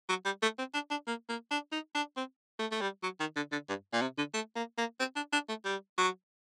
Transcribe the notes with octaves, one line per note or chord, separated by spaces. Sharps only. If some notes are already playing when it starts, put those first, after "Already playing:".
F#3
G3
A3
C4
D4
D4
A#3
A#3
D4
D#4
D4
C4
A3
A3
G3
F#3
D#3
D3
D3
G2
A#2
C3
D3
A3
A#3
A#3
C4
D4
D4
A3
G3
F#3